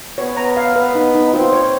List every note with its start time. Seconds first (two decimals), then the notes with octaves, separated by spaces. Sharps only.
0.18 B3 C#5
0.37 A#5
0.57 F5
0.76 B3 B4
0.95 D#4
1.14 D#4
1.33 C4 F4
1.53 C#5